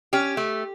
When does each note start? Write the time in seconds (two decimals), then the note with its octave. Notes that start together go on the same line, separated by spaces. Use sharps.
0.13 C#4 G4
0.37 A3